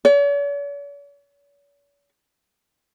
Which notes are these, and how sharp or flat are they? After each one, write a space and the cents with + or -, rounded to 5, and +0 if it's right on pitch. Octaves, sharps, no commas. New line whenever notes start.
C#5 +45